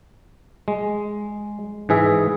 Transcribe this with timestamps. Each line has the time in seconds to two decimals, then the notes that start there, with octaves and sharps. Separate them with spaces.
0.68 G#3
1.89 G#2 E3 G#4 E5